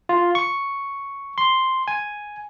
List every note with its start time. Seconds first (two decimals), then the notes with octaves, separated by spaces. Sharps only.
0.09 F4
0.35 C#6
1.38 C6
1.88 G#5